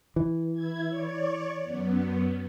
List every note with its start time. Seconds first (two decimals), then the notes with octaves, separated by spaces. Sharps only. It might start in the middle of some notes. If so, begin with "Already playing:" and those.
0.16 E3
0.54 E4 G#6
0.89 C#5 D5
1.62 F#2 B3